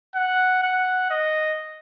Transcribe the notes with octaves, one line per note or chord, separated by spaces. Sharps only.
F#5
F#5
D#5